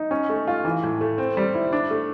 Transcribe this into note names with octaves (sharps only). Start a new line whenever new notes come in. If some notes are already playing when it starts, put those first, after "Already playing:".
Already playing: D#4
C#4
A3
F4
E3
A2
A3
C4
G3
E4
D4
A3